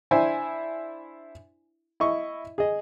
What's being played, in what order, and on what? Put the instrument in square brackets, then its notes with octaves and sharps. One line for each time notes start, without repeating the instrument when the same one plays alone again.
[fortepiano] D4 E4 C5 G#5
E4 D#5 C#6
G#4 D#5